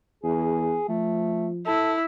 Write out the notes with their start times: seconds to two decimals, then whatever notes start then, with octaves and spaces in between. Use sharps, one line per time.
0.24 E2 G#4
0.89 F3 A3
1.66 E4 A4